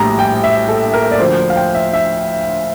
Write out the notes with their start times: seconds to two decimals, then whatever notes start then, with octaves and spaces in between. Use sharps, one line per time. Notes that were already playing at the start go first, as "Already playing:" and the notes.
Already playing: A#1 A2 G3 A#5
0.19 G5
0.44 E5
0.69 A4
0.93 A#4
1.11 D5
1.18 D2 D3 F3 C5
1.50 F5
1.56 G5
1.74 E5
1.93 E5